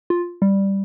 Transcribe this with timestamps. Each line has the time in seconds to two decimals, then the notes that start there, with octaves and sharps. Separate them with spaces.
0.10 F4
0.42 G3